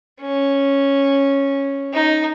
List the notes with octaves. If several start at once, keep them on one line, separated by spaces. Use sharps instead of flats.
C#4
D#4